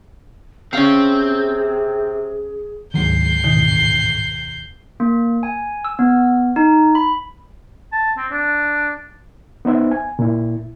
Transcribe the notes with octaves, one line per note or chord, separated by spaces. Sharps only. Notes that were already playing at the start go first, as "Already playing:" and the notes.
C3 C4 C#4 G#4 F5
D2 G#2 D#3 F#3 G#3 G6 C7
A1 E2 G#2 B2 D#3
A#3
G#5
E6
B3
D#4
B5
A5
C4
D4
B3 D#4 C5 E5
G#5
A#2 E4